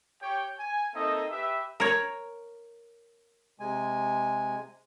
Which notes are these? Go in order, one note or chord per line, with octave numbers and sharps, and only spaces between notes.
G4 C#5 G5
G#5
A#3 C4 D#4 A4 D#5 E5
G4 B4 E5
A#4 C#5
C3 G#3 G#5